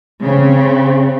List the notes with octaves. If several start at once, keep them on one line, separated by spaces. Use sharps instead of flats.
C#3 C4